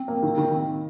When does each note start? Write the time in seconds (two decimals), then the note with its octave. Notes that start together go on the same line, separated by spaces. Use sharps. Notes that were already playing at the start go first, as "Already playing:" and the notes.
Already playing: C4
0.08 A#3
0.23 D#3
0.38 D#3